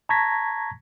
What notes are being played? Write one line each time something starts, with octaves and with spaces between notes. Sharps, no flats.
A5 A#5 C#6 G#6 A#6 B6